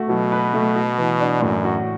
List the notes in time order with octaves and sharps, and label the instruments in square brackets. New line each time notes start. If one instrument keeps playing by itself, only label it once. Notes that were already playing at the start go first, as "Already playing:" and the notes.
Already playing: [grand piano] A3 F#4
[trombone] B2 [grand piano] F#3
[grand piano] B4
A3
F#4
E3
D4
[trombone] F#2 [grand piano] A2
[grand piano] F#4